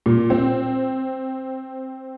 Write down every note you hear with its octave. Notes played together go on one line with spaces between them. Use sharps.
A#2
C4